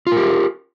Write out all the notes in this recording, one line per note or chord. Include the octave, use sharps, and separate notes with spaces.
F4 G4 A#4